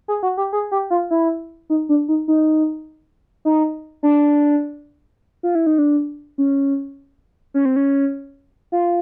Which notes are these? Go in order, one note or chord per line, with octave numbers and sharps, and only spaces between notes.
G#4
F#4
G4
G#4
G4
F4
E4
D#4
D4
D#4
D#4
D#4
D4
F4
E4
D#4
D4
C#4
C#4
C4
C#4
F4